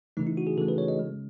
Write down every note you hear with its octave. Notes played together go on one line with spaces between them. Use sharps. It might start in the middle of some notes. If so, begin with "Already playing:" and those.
C#3 E3 A3 D#4
E4
F#4
G#4
C#3 E3 A3 A4
B4
C#5
D#5
C#3 G#3